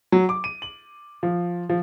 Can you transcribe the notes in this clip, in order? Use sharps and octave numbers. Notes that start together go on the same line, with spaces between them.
F#3
D6
D#7
F#7
F3
F3